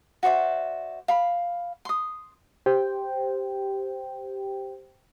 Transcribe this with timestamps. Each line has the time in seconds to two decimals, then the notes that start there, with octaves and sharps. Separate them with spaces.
0.23 F#4 C5 D5 E5
1.08 F5 B5
1.85 C6 D#6
2.66 G4 C5 G5